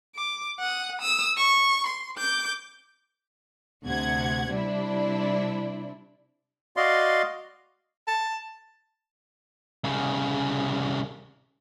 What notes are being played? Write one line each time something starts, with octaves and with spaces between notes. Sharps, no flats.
D6
F#5 D#6
D#6 E6
C#6
C6
D6 G6
D2 C3 F#5 G#6
C3 G3 D4 E4
F#4 D5 D#5 F5 C6
A5
C2 C#3